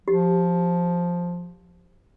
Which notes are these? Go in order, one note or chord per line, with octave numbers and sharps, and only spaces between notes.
F3 G4